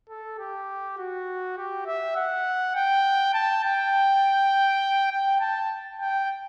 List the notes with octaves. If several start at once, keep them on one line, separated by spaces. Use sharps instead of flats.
A4
G4
F#4
G4
E5
F#5
G5
A5
G5
G5
A5
G5